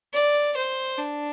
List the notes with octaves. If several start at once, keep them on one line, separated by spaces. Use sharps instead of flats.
D5
C5
D4